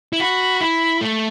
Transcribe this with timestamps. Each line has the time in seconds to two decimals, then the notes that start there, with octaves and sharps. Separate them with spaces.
0.13 E4
0.20 F#4 B5
0.61 E4 B5
1.01 A3